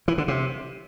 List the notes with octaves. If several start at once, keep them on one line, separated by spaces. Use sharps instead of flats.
E3
D3
C3